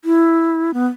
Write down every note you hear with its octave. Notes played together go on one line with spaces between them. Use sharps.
E4
B3